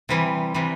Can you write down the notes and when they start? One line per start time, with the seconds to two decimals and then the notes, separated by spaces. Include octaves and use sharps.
0.09 C3 E3 G3
0.55 C3 E3 G3